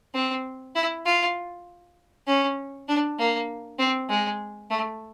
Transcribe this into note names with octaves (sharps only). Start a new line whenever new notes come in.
C4
E4
F4
C#4
D4
A#3
C4
G#3
A3